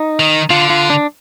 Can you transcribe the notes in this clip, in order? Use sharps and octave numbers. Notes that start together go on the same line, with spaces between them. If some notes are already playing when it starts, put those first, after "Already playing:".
Already playing: D#4
D#3
D3 F4
F4
D4